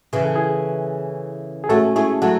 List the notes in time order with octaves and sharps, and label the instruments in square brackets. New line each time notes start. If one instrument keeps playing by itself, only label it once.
[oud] C#3 E3 [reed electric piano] G#4
[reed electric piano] A4
E4 G#4
G#4
[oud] A3 C#4 [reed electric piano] F#4 A4
[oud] A3 C#4 [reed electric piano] E4 G#4
[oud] F#3 A3 [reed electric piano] F#4 A4